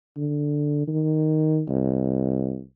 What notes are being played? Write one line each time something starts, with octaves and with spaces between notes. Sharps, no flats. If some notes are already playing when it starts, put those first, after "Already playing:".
D3
D#3
C2